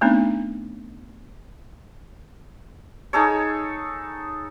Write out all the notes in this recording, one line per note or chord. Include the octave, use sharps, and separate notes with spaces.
A3 B3 C4 D4 D#4
D#4 G#4 A4 C#5